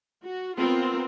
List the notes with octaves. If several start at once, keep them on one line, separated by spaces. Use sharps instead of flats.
F#4
B3 C4 F4 A#4